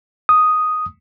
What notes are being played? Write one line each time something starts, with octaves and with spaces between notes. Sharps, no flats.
D#6